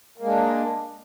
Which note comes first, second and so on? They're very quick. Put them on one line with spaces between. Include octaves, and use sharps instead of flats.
A#3 G#3 D4